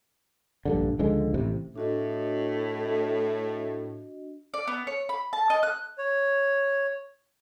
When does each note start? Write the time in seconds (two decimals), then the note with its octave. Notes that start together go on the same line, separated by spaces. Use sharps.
0.65 A#1 G2 D3
0.99 C#2 D3 F3 G#3
1.34 A1 C3
1.76 A2 D4 F#4 D#5
4.54 D5
4.68 B3
4.87 C#5
5.09 B5
5.33 A5
5.50 D#5
5.63 F#6
5.98 C#5